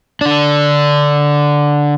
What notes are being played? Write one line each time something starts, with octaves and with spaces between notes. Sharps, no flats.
D3 D4